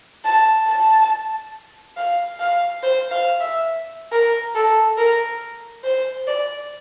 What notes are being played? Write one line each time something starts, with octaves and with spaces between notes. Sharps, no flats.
A5
A5
F5
F5
C5
F5
E5
A#4
A4
A#4
C5
D5